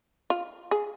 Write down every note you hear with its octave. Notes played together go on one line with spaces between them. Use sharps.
F4
G#4